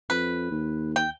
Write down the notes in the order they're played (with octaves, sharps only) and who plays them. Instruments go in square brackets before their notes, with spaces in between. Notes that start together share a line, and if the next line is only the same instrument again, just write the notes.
[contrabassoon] F2 [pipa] B4
[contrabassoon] D#2
[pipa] G5